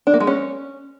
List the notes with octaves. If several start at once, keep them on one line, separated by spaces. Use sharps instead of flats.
D4
A#3
G#3
C#4